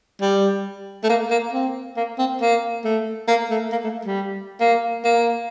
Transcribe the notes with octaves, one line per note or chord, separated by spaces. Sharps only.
G3
A3
A#3
A#3
C4
A#3
C4
A#3
A3
A#3
A3
A#3
A3
G3
A#3
A#3